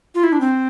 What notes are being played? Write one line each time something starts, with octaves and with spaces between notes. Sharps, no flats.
F4
E4
D4
C4